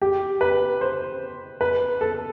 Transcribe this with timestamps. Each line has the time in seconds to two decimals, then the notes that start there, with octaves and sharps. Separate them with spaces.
0.02 G4
0.41 B4
0.81 C5
1.61 B4
2.01 A4